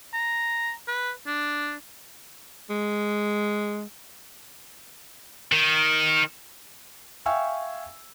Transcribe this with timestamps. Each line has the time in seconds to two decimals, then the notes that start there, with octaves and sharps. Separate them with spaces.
0.13 A#5
0.88 B4
1.26 D4
2.70 G#3
5.52 D#3
7.26 E5 F5 G5 G#5 C#6 E6